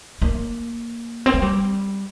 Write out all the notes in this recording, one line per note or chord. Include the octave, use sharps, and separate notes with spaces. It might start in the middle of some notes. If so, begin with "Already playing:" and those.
A#3
C4
A#3
G3